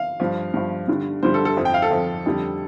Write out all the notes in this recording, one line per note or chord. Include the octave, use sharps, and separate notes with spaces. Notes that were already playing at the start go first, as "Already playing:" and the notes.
Already playing: F5
G2 F3
G2 F3
G2 D3 G3
G2 D3 G3 C5
A4
A4
F2 F3
G5
F5
A4
F2 F3
F2 D3 G3